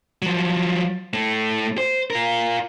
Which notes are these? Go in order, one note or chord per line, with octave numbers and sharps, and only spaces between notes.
F3 F#3
A2 A3
C5
F4 A#4